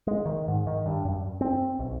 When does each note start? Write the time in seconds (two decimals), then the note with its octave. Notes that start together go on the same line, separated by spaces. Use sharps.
0.07 G#3
0.26 D#3
0.48 G#2
0.67 D#3
0.86 G2
1.05 F#2
1.41 C4
1.79 B1